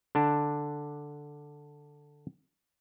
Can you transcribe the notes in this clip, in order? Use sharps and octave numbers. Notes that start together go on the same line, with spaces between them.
D3 D4